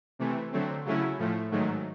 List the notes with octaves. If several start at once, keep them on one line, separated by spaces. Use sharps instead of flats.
C3 E3 A3
D3 F#3 A3 C4
C#3 F#3 A3 C#4 E4
A2 F3 A3
G#2 D#3 F#3 A3